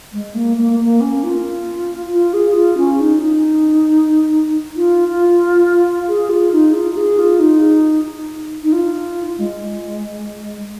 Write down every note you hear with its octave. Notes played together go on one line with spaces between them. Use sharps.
G#3
A#3
A#3
A#3
C#4
F4
F4
G#4
F4
C#4
D#4
D#4
F4
F4
G#4
F4
D#4
F4
G#4
F4
D#4
D#4
F4
G#3